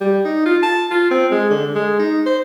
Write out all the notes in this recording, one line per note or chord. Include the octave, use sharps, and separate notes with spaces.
G3
D#4
F4
A5
F4
C4
G#3
D3
G#3
D#4
C5